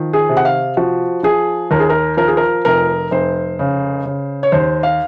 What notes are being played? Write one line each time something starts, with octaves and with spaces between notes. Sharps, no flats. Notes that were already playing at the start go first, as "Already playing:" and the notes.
Already playing: D#3 F3
G#4
C3
F#5
F5
F3 F#4
F3 G#4
D#2 A#4
G#4
A#4
F3 A#4
G#4
A#4
F1 A#4
F1 C5
C#3
C#3
C#5
D#2 C5
F5